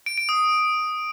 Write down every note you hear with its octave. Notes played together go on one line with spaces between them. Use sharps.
D7
D7
D#6